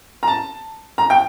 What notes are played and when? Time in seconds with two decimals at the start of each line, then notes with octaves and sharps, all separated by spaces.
0.23 A#5
0.27 A5
0.98 A#5
1.10 G5